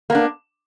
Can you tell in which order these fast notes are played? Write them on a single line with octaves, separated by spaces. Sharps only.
A#3 B3 D4